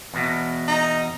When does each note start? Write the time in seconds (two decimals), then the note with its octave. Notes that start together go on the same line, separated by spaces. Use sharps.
0.14 E2 B2
0.68 D#4